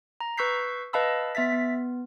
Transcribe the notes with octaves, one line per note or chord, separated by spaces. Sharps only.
A#5
B4 C#6 E6 G6 B6 C7
B4 D#5 F5 A5 B5 E6
B3 E5 A6 B6
B3